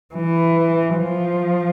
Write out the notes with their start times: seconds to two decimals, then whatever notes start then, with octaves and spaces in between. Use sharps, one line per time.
0.15 E3
0.97 F3